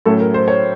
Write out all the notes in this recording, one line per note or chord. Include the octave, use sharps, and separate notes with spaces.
A2 F#3 A3 C#4 A4
A#4
C5
C#5